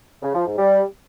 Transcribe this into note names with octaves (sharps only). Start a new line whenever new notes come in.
C#3
F3
G#2
G3